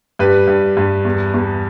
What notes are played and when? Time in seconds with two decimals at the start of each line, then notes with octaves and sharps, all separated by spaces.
0.19 G2 G4 B4
0.47 G2
0.77 G2
1.05 E2
1.34 E2